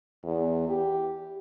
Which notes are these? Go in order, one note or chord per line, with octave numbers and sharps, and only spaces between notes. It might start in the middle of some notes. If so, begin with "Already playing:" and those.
E2
G4